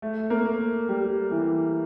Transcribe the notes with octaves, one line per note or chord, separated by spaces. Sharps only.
A3
A#3
G3
E3